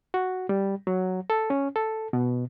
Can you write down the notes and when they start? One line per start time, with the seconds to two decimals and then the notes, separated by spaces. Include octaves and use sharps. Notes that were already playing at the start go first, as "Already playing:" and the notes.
0.14 F#4
0.49 G3
0.87 F#3
1.30 A4
1.50 C#4
1.76 A4
2.13 B2